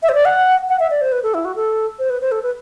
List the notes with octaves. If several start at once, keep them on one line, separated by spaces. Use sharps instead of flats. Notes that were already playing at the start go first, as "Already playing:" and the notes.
E5
C5
D5
F#5
F#5
E5
D5
C5
B4
A4
E4
F#4
A4
C5
B4
C5
A4
B4